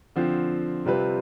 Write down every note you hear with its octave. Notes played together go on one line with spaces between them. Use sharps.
D3 F3 C4 F4
C3 G3 C4 F4 B4